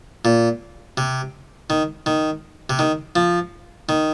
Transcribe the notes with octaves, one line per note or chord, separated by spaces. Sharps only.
A#2
C3
D#3
D#3
C3
D#3
F3
D#3